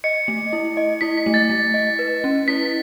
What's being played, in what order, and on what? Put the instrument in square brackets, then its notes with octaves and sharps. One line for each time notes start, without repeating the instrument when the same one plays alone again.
[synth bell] D#5 [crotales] C#7
[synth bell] A3
E4
D#5
[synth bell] E4 [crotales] B6
[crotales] B6
[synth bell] A3
[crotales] A6
[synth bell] A3
D#5
B4
C#4
[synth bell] E4 [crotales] B6